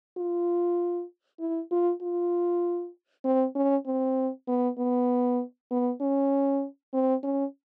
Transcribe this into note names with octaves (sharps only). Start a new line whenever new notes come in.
F4
E4
F4
F4
C4
C#4
C4
B3
B3
B3
C#4
C4
C#4